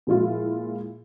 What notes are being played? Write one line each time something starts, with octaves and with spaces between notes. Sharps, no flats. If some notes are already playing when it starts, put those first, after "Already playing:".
A#2 F3 G#3 E4 F4